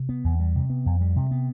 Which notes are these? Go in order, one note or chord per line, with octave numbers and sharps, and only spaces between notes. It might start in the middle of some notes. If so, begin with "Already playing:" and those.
Already playing: C3
B3
E2
G3
C3
B3
F2
G3
C3
B3